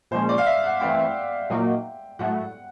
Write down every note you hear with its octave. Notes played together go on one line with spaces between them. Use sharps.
A#2 F3 G#3 C#4 C5
D5
F5
E5
F#5
E3 A3 C4 E4 G5
A#2 F#3 A#3 D#4
A2 F#3 A3 F#5